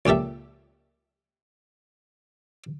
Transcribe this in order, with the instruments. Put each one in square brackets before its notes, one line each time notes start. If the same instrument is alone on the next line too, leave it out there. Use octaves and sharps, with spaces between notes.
[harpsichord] C#2 A#2 G4 A4 E5